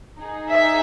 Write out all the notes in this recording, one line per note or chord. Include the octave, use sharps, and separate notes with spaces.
D#4 G#4
E5